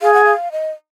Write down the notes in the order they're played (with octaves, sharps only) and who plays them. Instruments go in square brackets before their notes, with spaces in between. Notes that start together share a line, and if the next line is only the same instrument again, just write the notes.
[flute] G#4 [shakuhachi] F5
[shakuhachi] F#5
F5
D#5